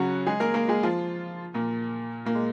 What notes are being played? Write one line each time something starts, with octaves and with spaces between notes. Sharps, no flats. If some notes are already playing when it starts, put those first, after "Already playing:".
Already playing: C#3 F#3 C#4 F#4
G#3 G#4
A#3 A#4
A#3 A#4
G#3 G#4
F3 F4
A#2 A#3
A#2 A#3
G#3